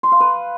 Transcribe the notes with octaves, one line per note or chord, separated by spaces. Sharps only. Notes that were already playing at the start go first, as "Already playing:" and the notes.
C6
F5
B4